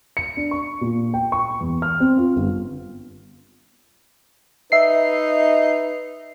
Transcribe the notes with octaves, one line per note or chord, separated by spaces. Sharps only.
C#7
D4
C#6
A#2
G5
C#6
E2
F6
C4
F4
G1
D#4 B4 E5 C7